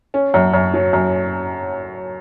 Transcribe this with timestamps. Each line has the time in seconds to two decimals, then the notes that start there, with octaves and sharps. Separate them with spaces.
0.14 C#4
0.34 F#2
0.54 F#2
0.74 F#3
0.93 F#2